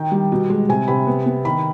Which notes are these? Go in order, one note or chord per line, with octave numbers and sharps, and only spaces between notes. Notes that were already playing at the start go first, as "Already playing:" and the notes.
Already playing: D#3 G5
G3
B2
G#3
C3 G#5
C3 B5
B3
B3
D#3 B5